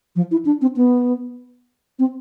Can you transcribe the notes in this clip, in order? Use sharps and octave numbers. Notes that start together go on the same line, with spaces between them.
F3
E4
D4
C4
B3
C4